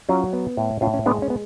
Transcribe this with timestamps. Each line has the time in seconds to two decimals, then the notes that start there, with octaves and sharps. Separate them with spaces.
0.09 F#3 C#4 F4
0.33 B3
0.57 A2
0.81 A2 C#4 F4
0.94 C#4
1.06 G#3 B3 D4
1.22 C#4
1.30 B3